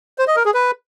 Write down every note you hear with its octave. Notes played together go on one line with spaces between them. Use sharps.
C5
D#5
A#4
G#4
B4